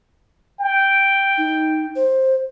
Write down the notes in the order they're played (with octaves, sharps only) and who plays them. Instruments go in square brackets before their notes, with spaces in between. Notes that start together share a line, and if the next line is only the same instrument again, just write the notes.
[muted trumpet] G5
[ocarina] D#4
C5